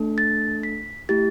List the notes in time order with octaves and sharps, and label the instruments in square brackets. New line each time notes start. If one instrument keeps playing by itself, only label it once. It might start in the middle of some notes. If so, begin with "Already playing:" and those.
Already playing: [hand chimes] A3 D4 A4
A6
B6
A3 E4 G4 A6